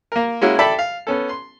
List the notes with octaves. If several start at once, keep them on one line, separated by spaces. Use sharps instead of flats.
A#3 A#4
G#3 A#3 C#4 E4 F#4
A4 D5 E5 G5 A5 B5
F5
B3 C#4 A4
C6